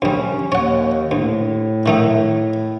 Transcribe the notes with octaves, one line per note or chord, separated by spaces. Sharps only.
D2 G3 C#4
D#2 C#5 F#5
D2 A2
D#3 A3 D#4